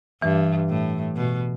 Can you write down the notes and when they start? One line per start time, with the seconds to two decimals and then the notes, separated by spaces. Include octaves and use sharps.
0.22 G2 E3
0.69 A2
1.16 B2